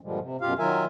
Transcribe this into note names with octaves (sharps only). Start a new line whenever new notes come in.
G2 A#2 D3 F3 G3 G#3
C3
F#2 B2 F4 G4 F5
D#3 F#3 F4 A#4 E5 G#5